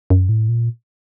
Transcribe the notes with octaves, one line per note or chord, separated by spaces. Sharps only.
F#2
A2
A#2